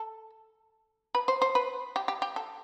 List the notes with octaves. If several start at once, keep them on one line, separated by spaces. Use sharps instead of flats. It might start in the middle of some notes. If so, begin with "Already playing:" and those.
Already playing: A4
B4
C5
C5
B4
G4
G4
G4
A4